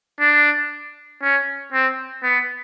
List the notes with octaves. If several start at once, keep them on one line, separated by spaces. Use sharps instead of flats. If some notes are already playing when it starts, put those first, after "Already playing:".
D4
C#4
C4
B3